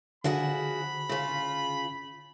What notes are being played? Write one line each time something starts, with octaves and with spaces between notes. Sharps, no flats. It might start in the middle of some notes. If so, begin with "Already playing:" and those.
D3 F3 F#4 G#4 B5
C#3 F4